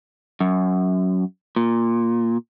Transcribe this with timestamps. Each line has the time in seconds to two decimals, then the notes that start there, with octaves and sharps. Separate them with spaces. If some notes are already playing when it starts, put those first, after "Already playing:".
0.40 F#2
1.56 A#2